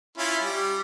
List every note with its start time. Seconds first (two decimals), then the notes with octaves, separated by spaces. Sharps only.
0.18 C#4 E4 F4
0.42 G3